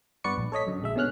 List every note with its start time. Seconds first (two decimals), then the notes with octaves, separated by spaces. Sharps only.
0.24 G2 B3 B4 D5 C#6 C#7
0.38 A#1
0.52 A4 C#5 D#5 B6
0.67 F#2 D3
0.82 A#1 G#3 E5
0.96 B2 D3 C#4 F6 F#6